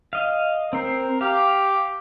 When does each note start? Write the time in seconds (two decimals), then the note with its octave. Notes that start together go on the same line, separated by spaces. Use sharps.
0.13 D#5 F5
0.73 C4 A#4 C5
1.21 G4 F5